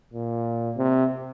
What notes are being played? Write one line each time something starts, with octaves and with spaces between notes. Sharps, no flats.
A#2
C3